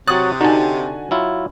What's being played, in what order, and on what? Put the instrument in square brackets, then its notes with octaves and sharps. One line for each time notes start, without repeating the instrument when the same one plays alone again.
[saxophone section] C3 [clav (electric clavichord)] F#3 F#4 C#5 [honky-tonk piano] D#6 A6 [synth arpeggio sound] F#6
[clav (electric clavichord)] D3 A5 [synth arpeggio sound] D#4 [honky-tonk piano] F#4 G#5
[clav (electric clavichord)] F#3 E4 F4